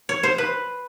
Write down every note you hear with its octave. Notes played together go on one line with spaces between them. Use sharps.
C#5
C5
B4